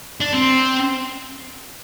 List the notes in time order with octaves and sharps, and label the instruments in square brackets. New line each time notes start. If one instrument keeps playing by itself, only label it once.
[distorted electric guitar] D4
C4